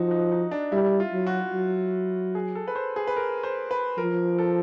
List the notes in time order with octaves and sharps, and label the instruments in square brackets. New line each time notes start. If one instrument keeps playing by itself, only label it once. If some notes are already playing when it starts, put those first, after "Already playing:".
Already playing: [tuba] F3 [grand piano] D#4 F#4
[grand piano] D#4
D#4
D4
[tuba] G3 [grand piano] E4
[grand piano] F4
[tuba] F#3
[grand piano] F#4
[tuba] F#3
[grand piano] G#4
A4
B4
C5
G#4
B4
A#4
C5
B4
[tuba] F3 [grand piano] A#4
[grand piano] A4